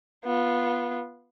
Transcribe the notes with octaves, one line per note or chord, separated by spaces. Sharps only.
B3 F4